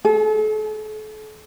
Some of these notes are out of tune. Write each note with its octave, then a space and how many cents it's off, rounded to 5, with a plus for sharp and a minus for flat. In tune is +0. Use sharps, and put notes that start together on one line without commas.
A4 -40